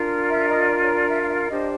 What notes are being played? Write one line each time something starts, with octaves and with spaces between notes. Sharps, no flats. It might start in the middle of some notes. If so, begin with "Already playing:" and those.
Already playing: D4 F4 A#4
E5
D#5
D5
C#5
D5
E5
F5
E5
F5
D4 G4 C5 D#5